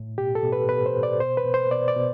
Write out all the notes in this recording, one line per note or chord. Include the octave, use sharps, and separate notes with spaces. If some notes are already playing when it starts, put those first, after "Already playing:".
Already playing: A2
B2 G4
A4
B2
B4
B2 B4
C5
B2
D5
B2 C5
B4
B2
C5
B2 D5
D5
B2